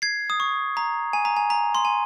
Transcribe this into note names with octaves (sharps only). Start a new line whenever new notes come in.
G#6 C7
D#6
C#6
A#5
G#5
A#5
G#5
A#5
C6
G#5